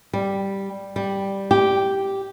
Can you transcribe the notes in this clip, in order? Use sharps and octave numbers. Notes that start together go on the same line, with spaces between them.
G3
G3
G4